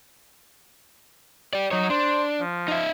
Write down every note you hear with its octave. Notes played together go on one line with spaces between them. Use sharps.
G4 D5
F#3 D#4 C#5
D4 C5
F3
D#4 E5